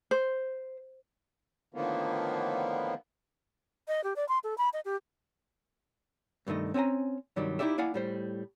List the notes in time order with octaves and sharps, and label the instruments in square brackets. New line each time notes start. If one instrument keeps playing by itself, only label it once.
[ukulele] C5
[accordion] A2 D3 D#3 F3 A#3 B3
[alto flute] D#5
G4
D5
C6
A4
B5
D#5
G4
[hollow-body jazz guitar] C2 G2 D#3 A3 D#5
C4 C#4 F#5 G#5 A#5
C2 G2 D#3 F#3 G3 D5
D#4 E4 F#4 G4 D5 E5
A#3 E4 D5 F5 F#5 G#5
A2 G3 C5